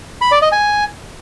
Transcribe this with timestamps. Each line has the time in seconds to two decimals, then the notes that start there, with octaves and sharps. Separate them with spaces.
0.22 B5
0.32 D5
0.42 D#5
0.52 G#5